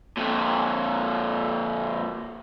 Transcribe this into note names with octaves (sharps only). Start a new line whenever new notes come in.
F2 A#2